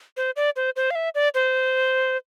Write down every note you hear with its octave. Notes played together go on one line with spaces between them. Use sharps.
C5
D5
C5
C5
F5
E5
D5
C5